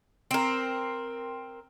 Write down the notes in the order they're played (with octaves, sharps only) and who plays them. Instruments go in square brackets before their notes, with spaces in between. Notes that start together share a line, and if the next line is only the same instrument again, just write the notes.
[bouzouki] C4 A#4